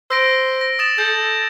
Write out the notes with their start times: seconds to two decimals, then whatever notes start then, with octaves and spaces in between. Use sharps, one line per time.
0.10 C5 E6 A#6 D7
0.61 A#6
0.79 D#6 A6 E7
0.98 A4 G6